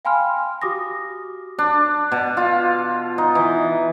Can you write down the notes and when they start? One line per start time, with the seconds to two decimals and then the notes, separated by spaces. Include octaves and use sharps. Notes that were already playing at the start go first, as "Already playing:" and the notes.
0.05 F5 G5 G#5 B5 C6 F6
0.62 F#4 G4 D6 D#6 A#6
1.59 D4
2.12 B2
2.37 F4
3.18 D#4
3.35 E3